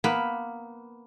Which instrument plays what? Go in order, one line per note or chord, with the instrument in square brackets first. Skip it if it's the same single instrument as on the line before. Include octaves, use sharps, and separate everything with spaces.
[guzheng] A#3 B3 B4 B5